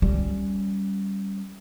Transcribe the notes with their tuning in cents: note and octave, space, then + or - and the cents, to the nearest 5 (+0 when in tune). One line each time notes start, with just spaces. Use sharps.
G3 +0 C#4 +0